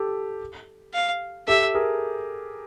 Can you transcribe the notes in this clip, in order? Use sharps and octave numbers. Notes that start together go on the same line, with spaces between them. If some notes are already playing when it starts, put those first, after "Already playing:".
Already playing: G4 A4
F5
G4 A4 E5
G#4 A#4